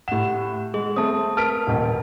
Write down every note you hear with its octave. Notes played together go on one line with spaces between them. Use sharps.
A2 G4 F#5 E7
G#3 G#4
A3 C4 A5 D#6
A#4 B4 A5 F6 B6 D7
D#1 A1 G5